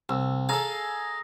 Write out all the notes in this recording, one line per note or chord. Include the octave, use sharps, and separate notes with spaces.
C2 E6
G#4 A4 F5 A#5 E6